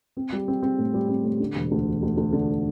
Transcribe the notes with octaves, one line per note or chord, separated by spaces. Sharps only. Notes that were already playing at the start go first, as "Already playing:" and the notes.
C4
G3
C4
C4
A2
G3
C4
A2
D3
E1
D2
E1
D2
D2
D3